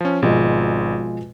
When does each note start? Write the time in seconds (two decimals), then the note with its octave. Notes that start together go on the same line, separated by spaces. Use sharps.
0.01 F3 C#4
0.22 G#1 B2 F3 G#3